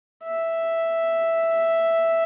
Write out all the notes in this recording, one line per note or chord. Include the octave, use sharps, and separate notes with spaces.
E5